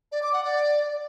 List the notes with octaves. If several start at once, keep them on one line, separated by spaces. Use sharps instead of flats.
D5
D6
F#5
D5